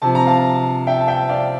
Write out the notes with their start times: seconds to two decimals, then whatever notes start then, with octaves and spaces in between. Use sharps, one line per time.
0.02 C3 F3 A5
0.15 A#5
0.27 F5 A5
0.87 E5 G5
1.00 A5
1.08 E5 G5
1.29 D5 F5